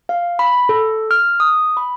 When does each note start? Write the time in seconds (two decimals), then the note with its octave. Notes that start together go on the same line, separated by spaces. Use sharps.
0.09 F5
0.39 B5
0.69 A4
1.11 F6
1.40 D#6
1.77 B5